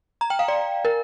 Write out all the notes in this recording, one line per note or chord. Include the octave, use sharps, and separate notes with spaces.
A#5
G5
F5
D5
A#4